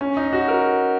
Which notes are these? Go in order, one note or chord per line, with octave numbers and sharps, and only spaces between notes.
C#4
D#4
F#4
A#4